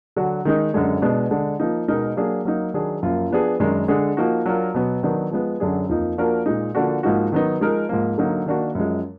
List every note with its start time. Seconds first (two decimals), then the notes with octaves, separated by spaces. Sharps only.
0.16 D3 F#3 D4 F#4
0.45 D#3 G#3 D#4
0.73 F#2 D3 G#3 D4
1.02 B2 G#3 B3 D4
1.31 D3 G#3 D4
1.60 F3 A#3 D#4
1.88 B2 G#3 D#4 A#4
2.17 F#3 A#3 D4 G#4
2.45 F#3 A#3 D#4
2.74 D#3 F#3 D4 G#4
3.03 F#2 F3 A#3 F4
3.31 F3 B3 D4 G#4
3.60 F#2 D#3 G#3 D4
3.88 D3 G#3 D4 G#4
4.17 F3 A#3 D#4 F#4
4.46 F#3 D4 F4 A#4
4.74 B2 F#3 B3
5.03 D#3 F#3 B3 D4
5.31 F3 G#3 B3
5.60 F#2 D3 F#3 D4 G#4
5.89 F2 F3 A#3 D#4
6.18 F3 A#3 D4 F#4 A#4
6.46 A#2 G#3 D#4
6.75 D3 F3 A#3 D4 F#4
7.03 G#2 F3 A#3 D#4 F#4
7.32 D#3 F#3 B3 D#4
7.60 F3 G#3 D#4 A#4
7.89 G#2 F3 A#3
8.18 D3 F#3 A#3 D#4
8.46 D#3 A#3 D4 F#4
8.75 F#2 F3 G#3